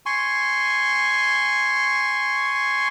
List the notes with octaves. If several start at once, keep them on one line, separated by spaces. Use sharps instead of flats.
G#5 C6 C#6